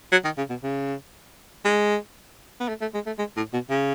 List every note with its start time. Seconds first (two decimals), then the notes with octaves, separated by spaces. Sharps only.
0.12 F#3
0.24 D#3
0.37 C#3
0.50 B2
0.63 C#3
1.65 G#3
2.60 B3
2.68 A3
2.81 A3
2.94 G#3
3.06 A3
3.18 G#3
3.36 A2
3.53 B2
3.69 C#3